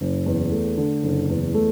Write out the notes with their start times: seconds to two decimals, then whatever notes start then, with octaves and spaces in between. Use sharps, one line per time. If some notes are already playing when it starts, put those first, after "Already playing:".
0.01 F#1
0.26 E2
0.52 A3
0.77 D3
1.03 F#1
1.29 E2
1.54 A3